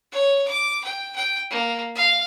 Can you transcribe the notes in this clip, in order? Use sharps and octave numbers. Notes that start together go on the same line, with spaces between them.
C#5
D6
G5
G5
A#3
F5